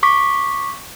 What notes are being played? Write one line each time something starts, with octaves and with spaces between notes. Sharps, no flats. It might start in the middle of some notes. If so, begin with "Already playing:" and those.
C#6 D6 B6